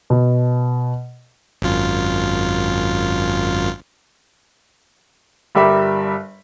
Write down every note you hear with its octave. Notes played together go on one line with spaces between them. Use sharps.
B2
G#1 F#2 F4
G1 G3 G4 A#4 E5 B5